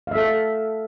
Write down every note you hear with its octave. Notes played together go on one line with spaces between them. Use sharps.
A4 E5 F5